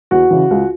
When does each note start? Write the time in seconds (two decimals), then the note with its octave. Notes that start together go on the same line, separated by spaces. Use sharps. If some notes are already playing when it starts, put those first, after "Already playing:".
0.11 E2 F#4
0.31 C#3 E3
0.51 C#2